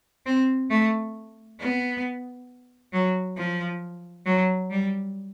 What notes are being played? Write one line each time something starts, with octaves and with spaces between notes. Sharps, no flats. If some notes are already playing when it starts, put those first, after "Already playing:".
C4
A3
B3
F#3
F3
F#3
G3